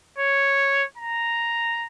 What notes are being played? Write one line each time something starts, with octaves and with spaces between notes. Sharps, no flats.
C#5
A#5